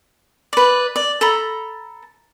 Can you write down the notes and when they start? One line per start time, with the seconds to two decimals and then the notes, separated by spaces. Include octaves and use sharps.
0.53 B4 D5
0.96 D5
1.21 A4 A#5 B5